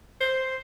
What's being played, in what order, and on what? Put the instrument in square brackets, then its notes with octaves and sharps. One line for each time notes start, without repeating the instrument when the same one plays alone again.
[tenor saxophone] C5